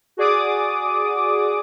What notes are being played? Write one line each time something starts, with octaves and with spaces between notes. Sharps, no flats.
F#4 G#4 D5 D6 D#6